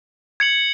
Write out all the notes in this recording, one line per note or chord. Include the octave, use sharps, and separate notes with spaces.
G#6 C#7 F#7